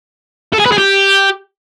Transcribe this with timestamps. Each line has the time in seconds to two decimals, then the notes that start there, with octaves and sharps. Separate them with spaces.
0.53 A4
0.59 G#4
0.66 B4
0.72 G#4
0.78 G4